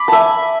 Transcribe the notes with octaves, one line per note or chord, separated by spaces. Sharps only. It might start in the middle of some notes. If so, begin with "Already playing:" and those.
Already playing: B5 D6
E5 G#5 A5